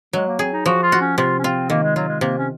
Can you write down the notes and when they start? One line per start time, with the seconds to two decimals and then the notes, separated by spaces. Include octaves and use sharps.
0.13 F#3 G#3
0.27 A#3
0.39 C4 G#4
0.52 D#4
0.66 F3 F#4
0.83 F4
0.92 F#4
1.01 C#4
1.18 C3 F4
1.38 C#4
1.44 C4 F4
1.70 D#3 A#3
1.83 G#3
1.96 F#3 F4
2.08 G#3
2.21 C3 A#3
2.38 C#4